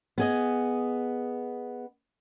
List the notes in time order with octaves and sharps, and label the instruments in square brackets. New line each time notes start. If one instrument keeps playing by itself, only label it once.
[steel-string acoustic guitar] B3 G#4 D#5